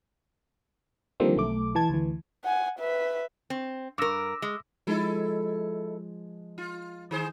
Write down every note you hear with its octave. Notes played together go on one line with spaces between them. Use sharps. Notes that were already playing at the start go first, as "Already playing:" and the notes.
D3 D#3 F3 G3 A#3 C4
B1 A3 D6
E3 A5 G#6
D2 E3
F#5 G#5
B4 E5
C4
G2 A#4 D6 E6 A#6
G#3
F3 G#3 D#4 E4 A4
F4
D#3 G#4 C5